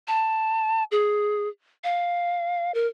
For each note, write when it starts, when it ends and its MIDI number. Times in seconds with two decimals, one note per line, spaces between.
0.08 0.84 81
0.92 1.49 68
1.84 2.72 77
2.74 2.87 70